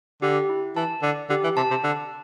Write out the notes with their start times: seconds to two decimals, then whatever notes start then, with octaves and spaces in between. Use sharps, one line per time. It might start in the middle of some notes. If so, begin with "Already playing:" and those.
0.22 D3 G4
0.49 E4
0.76 E3 A5
1.03 D3 D5
1.30 D3 G4
1.44 E3
1.57 C3 A5
1.71 C3
1.84 D3 A5